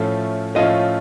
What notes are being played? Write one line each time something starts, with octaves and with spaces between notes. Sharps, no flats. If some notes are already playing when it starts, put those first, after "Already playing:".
Already playing: A2 F3 A3 C#4 F4 E5
A2 F3 A3 C#4 F4 D#5 F5